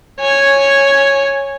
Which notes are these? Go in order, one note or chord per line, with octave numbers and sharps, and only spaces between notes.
C#5 G#5